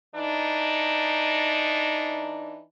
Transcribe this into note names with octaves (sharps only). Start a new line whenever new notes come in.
E3 D4 D#4